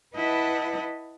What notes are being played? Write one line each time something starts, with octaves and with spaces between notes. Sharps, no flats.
E4 B4 D#5 F#5 A5